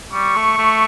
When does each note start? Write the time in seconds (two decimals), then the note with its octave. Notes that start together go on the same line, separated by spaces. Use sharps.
0.13 G3 C#6
0.36 A3
0.58 A3